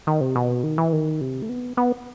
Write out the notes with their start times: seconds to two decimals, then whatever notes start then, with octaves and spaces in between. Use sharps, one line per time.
0.07 D#3
0.21 C3
0.36 B2
0.64 D#3
0.78 E3
0.92 D#3
1.21 C3
1.42 A3
1.49 B3
1.77 B3